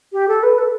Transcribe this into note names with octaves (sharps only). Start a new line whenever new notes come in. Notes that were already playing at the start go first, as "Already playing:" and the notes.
G4
A4
B4
A4